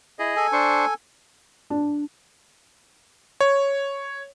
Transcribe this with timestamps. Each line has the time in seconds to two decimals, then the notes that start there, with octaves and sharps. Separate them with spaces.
0.19 E4 G#4 D#5
0.36 A4 G#5
0.53 D4 C5 C#6
1.70 D4
3.41 C#5